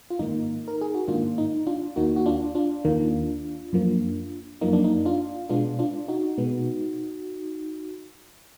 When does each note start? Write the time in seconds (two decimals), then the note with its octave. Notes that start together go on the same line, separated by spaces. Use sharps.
0.10 F4
0.19 G#2 D#3 A#3 D#4
0.68 A#4
0.81 G#4
0.95 F#4
1.08 G#2 D#3 A#3 D4 F4
1.38 D#4
1.67 D4 F4
1.96 D#2 D#3 A#3 D#4 F#4
2.16 F#4
2.26 D4 F4
2.55 D4 F4
2.85 D#2 D#3 A#3
3.73 F#2 F3 A#3
4.61 F#2 F3 A#3 D#4
4.73 D4
4.84 D#4
5.05 D4 F4
5.49 B2 G#3 B3 D4 F4
5.79 D4 F4
6.08 D#4 F#4
6.38 B2 G#3 B3